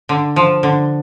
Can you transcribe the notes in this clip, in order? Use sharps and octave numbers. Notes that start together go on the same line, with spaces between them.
D3
F3
D3